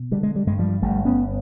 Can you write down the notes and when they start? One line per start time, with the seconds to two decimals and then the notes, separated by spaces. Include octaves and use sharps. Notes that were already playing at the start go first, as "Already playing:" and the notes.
Already playing: B2
0.11 D3 G3
0.23 G#3
0.36 G3
0.47 G2 G#3
0.59 F3 G3
0.82 G1 G3 A3
1.05 B3 C#4